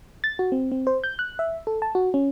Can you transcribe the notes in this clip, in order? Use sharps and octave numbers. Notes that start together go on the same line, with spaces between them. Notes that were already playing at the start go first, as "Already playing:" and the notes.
A6
F#4
C4
C4
C5
G6
F#6
E5
A4
A5
F#4
C#4